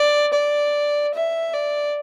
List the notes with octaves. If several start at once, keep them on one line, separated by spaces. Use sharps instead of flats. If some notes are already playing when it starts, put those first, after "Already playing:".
Already playing: D5
D5
E5
D5